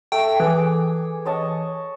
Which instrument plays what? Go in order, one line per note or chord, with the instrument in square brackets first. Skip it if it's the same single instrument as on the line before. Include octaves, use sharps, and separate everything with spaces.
[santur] A3 [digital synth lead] G5
[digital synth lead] E3 [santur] G#4 A4 D6
[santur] C#5 D#5 A5